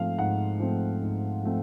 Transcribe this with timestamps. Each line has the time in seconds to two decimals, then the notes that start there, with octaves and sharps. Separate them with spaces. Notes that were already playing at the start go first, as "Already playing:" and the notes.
Already playing: G#2 F3 A3 C4 F5
0.18 G#2 F#5
0.60 F3 A3 C4
1.02 G#2
1.43 F3 A3 C4